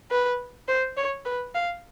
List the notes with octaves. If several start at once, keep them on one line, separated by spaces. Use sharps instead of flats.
B4
C5
C#5
B4
F5